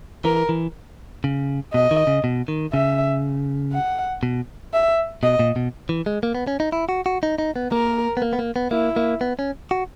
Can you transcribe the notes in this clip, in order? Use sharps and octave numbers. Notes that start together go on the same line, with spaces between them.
E3 A#4
E3
C#3
B2 D#5
D#3
C#3
B2
D#3
C#3 E5
F#5
B2
E5
B2 D#5
A#2
B2
E3
G#3
A#3
B3
C#4
D#4
E4
F#4
F#4
D#4
D#4
B3
A#3 A#4
B3
A#3
B3
A#3
B3
A#3 E4
A#3
B3
C#4
F#4